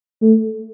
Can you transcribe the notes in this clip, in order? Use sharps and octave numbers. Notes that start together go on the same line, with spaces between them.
A3